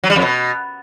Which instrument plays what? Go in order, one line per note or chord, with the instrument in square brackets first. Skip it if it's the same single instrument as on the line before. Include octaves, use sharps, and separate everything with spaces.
[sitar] F#3
G3
F2
B2